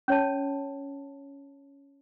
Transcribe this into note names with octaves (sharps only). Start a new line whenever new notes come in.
C#4 C#5 A5